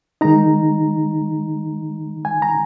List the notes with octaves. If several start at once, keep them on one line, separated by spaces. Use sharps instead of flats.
D#3 G#3 D#4 A#5
G#5
A#5